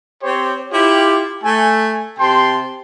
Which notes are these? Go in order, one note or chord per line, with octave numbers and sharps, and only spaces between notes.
C4 G4 C5 C#5
E4 F4 G4
A3 G#5
C3 G5 A5 C6